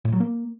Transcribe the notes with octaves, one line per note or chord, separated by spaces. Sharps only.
A2
F#3
A#3